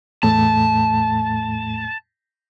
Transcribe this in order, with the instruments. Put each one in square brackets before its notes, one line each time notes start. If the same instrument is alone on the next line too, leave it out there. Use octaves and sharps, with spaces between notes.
[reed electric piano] E2 A2 A3 [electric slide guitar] A5